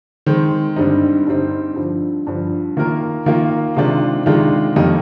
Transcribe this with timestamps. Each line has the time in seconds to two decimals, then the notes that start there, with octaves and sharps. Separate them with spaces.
0.26 D#3 G#3 C4
0.76 G2 D3 G3 C4 D#4
1.27 G2 D3 G3 C4 D#4
1.76 G2 D3 F3
2.27 G2 D3 F3
2.77 D#3 A#3 F4 A#4
3.26 D#3 A#3 F4 A#4
3.77 C3 D#3 G#3 D4 F4
4.26 C3 D#3 G#3 D4 F4
4.76 F2 D#3 G3 A#3 D#4